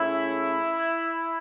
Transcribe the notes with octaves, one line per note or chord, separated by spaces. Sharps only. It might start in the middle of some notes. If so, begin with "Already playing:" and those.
Already playing: C#3 A3 C#4 E4